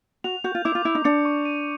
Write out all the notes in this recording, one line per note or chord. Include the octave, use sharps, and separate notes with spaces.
F#4 F7
F#4 G6
F4
E4 D6
F4
E4 D6
D#4
D4 C#7
C#6
D#7